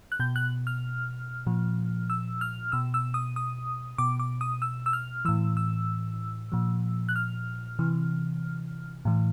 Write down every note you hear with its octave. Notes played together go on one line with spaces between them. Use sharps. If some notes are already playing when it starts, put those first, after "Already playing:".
F#6
B2 G6
F#6
F6
A#2 F3
E6
F6
B2 E6
E6
D#6
D#6
B2 D6
D6
D#6
E6
E6
F6
A2 E3 E6
E6
A#2 F3
F#6
F6
C3 E3
A2 E3